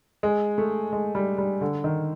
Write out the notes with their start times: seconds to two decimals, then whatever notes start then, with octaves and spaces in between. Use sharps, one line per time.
0.23 G#3
0.58 A3
0.92 G#3
1.15 G3
1.38 G3
1.61 D3
1.84 D#3